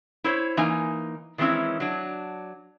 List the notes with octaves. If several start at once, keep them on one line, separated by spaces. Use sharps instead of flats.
E4 C5 C#5
E3 A#3 D#4 G#5
D#3 E3 G#3 C4 C#4 E4
F#3 D4